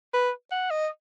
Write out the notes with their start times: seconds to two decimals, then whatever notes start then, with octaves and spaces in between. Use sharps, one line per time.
0.14 B4
0.51 F#5
0.70 D#5